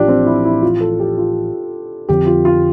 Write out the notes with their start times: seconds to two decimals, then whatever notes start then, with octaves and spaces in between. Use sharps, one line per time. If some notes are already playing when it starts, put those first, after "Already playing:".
Already playing: A1 A2 F3 D4 F4 G4
0.08 C4
0.26 E4
0.45 E4
0.62 F4
0.80 A4
1.00 G4
1.18 F4
2.09 F2 D3 F3 C4 G4
2.26 F4
2.45 F4